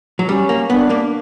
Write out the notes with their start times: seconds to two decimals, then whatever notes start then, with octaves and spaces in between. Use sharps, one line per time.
0.19 F#3
0.28 G3 C#4
0.49 A#3
0.70 B3 D4
0.90 A#3